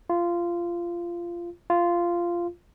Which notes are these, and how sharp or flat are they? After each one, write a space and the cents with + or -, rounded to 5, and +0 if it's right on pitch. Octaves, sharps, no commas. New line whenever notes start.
F4 -15
F4 -10